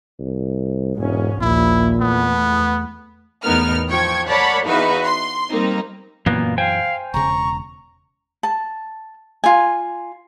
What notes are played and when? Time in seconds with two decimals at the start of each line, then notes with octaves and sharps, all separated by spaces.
0.19 C2
0.97 E1 G#2 C#4
1.41 A#1 D#2 A#2 E4
2.01 E2 A3 B3
3.44 E2 A2 B3 D#4 A#4 F6
3.89 F3 G5 C#6 G#6
4.28 A#4 C#5 D5 F#5 A5 B5
4.67 E2 D#4 F#4 B4 E5 F5
5.04 C6
5.50 G3 A#3 C4 D#4
6.26 F#2 A#2 E3 F#3 A#3 B3
6.58 C5 F5 G5 G#5
7.14 E1 C#3 A#5 C#6
8.43 A5
9.44 F4 G#5